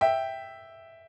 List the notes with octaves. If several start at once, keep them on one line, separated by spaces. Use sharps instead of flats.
E5 G5